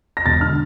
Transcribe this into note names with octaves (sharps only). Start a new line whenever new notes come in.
A#6
E1 A6
D3 F6